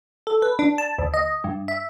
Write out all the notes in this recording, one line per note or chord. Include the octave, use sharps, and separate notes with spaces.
A4
B4
D4
A5
D2
D#5
G2
E5